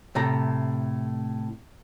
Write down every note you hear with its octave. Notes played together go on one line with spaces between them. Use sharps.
A2 C3 A3 A#5